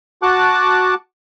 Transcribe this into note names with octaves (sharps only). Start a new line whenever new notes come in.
F#4 F#5 A5 D6 F#6